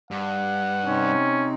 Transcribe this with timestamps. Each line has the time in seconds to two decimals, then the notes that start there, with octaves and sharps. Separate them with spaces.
0.11 G2 F#5
0.85 C3 C4 C#4 D#4